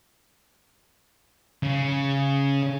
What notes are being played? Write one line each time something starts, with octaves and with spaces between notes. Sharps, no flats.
C#3